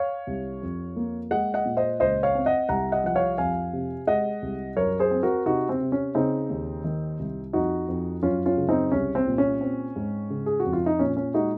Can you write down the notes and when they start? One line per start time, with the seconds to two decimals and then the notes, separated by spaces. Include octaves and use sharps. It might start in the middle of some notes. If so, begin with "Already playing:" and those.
Already playing: C#5 F5
0.27 C2
0.62 F2
0.96 A#3
1.31 G#3 D#5 F#5
1.54 D#5 F#5
1.66 A#2
1.77 C5 D#5
2.00 C#2 C5 D#5
2.23 C#5 F5
2.35 C4
2.46 D#5 F#5
2.69 C2 F#5 A#5
2.92 D#5 F#5
3.04 F3 F#5
3.15 C#5 F5
3.38 F2 F5 G#5
3.73 C3
4.07 G#3 D#5 F#5
4.42 C2
4.77 F#2 A#4 C#5
4.99 G#4 C5
5.11 C4
5.23 F#4 A#4
5.46 C3 D#4 F#4
5.69 C4
5.81 C3
5.92 C#4
6.15 C#3 C4 D#4
6.50 D#2
6.84 D#3
7.19 C2
7.53 F2 D#4 F#4
7.88 F2
8.23 F#2 C#4 F4
8.46 C#4 F4
8.57 C#3
8.69 C4 D#4
8.92 C2 C#4
9.15 C4
9.26 A#2
9.38 C#4
9.61 C4
9.96 G#2
10.30 C#3
10.46 G#4
10.60 F#4
10.65 F2
10.73 F4
10.86 D#4
10.99 A#2 C#4
11.17 C#4
11.34 G#3 D#4 F#4